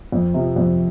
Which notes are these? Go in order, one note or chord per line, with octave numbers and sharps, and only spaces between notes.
F2
C3 F3
F2